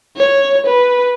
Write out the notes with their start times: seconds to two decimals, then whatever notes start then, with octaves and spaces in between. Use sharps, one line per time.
0.17 C#5
0.66 B4